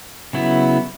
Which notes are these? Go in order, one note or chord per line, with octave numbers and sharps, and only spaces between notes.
C#3 F#3 B3 E4